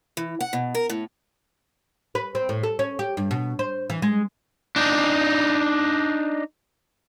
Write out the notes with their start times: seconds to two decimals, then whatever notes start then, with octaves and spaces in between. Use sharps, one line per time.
0.17 E3
0.41 F#5
0.53 B2
0.75 A#4
0.90 A2
2.15 B4
2.35 C4
2.49 A2
2.63 A4
2.79 C#4
2.99 G4
3.17 G2
3.31 B2
3.59 C5
3.90 E3
4.02 G#3
4.76 D4 D#4